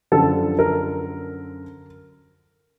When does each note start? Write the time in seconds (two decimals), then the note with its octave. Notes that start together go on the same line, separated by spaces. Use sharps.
0.12 F#2 D3 F3 A4
0.59 A#4